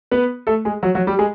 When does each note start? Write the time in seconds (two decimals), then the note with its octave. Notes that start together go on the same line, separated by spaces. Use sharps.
0.11 B3 B4
0.47 A3 A4
0.65 G#3 G#4
0.83 F#3 F#4
0.95 F#3 F#4
1.07 G3 G4
1.19 G#3 G#4